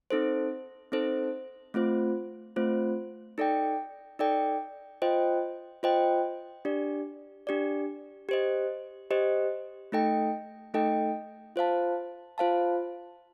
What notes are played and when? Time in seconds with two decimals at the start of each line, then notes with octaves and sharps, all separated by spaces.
0.10 C4 D#4 A4 C5
0.92 C4 D#4 A4 C5
1.74 A3 C4 F4 C5
2.56 A3 C4 F4 C5
3.38 D#4 A4 D5 G5
4.19 D#4 A4 D5 G5
5.02 F4 C5 D#5 G5
5.83 F4 C5 D#5 G5
6.65 D4 G4 D5
7.47 D4 G4 D5
8.29 G4 C5 D#5
9.11 G4 C5 D#5
9.92 A3 D#4 A4 D#5 G5
10.74 A3 D#4 A4 D#5 G5
11.56 F4 C5 F5 A5
12.38 F4 C5 F5 A5